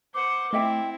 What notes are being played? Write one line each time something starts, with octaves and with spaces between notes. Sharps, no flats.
C5 F#5 D6
A3 C4 E4 D#5 E5 G5